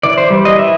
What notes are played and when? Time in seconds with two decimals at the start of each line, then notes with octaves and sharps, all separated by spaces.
0.03 E3 D5
0.18 C5
0.31 G3
0.45 D#5
0.58 E3 E5